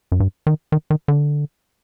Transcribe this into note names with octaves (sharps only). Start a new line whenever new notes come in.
F#2
G2
D#3
D#3
D#3
D3